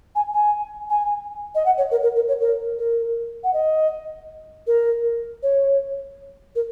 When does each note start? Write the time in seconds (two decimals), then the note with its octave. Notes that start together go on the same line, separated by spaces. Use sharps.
0.15 G#5
0.34 G#5
0.90 G#5
1.55 D#5
1.65 F#5
1.78 C#5
1.91 A#4
2.03 A#4
2.16 A#4
2.28 C#5
2.41 A#4
2.79 A#4
3.44 F#5
3.53 D#5
4.67 A#4
5.43 C#5
6.55 A#4